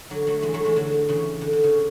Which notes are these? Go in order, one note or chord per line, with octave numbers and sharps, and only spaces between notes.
D3 F#3
F#3 A3
E3 G#3
F#3 A3
E3 G#3
D3 F#3
C#3 E3
D3
D3
C#3